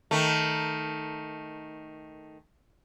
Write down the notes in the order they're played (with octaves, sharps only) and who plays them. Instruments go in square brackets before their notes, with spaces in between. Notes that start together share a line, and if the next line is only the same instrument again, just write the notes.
[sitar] D#3 A3